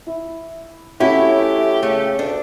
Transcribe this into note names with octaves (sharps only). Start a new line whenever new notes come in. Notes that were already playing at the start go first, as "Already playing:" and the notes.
E4
A3 C#4 E4 F#4 G4 C#5
C#3 A3
D2 D4